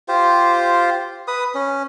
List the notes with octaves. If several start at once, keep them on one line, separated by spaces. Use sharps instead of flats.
F4 G4 C5
B4 D#6
C#4